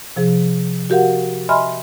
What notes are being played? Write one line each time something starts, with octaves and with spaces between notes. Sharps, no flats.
C3 F3 G#4
F#4 G4 A#4 F5 F#5
D#5 E5 G#5 B5 C6 F6